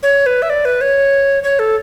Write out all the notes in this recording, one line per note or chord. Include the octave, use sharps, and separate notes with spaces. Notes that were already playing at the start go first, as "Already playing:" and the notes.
C#5
B4
E5
D5
B4
C#5
C#5
A4